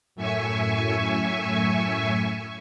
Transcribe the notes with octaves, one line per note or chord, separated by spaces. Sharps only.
F#2 A2 E5 G#5 C#6